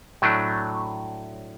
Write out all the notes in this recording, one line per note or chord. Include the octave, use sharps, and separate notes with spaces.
A2 F#3 A3 D4